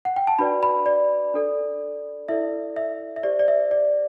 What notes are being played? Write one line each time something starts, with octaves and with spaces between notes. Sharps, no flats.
F#5
G5
A5
D4 F#4 B4 D5 B5
B5
D5
D4 A4 D5
E4 A4 D5 E5
E5
E5
G4 C5 D5
D5
E5
D5